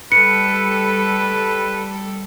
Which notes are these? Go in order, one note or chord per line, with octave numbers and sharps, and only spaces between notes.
G3 A4 B4 C#7